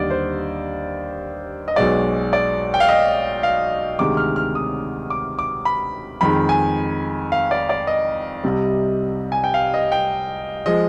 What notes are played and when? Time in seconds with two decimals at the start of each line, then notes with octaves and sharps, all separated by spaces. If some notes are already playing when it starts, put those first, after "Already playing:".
Already playing: D#2 D3 G3 D5 D#5
0.10 C5
1.68 D#5
1.76 B1 B2 G#3 D5
2.33 D5
2.74 G5
2.80 F5
2.88 D#5
3.43 F5
3.99 D2 C3 D#3 G#3 D6
4.17 F6
4.36 F6
4.55 D#6
5.10 D6
5.39 D6
5.65 B5
6.21 F2 D#3 G#3 B5
6.49 G#5
7.32 F5
7.51 D5
7.69 D5
7.87 D#5
8.44 C2 C3 G3
9.32 G#5
9.44 G5
9.54 F5
9.74 D#5
9.92 G5
10.66 F3 G#3 D#5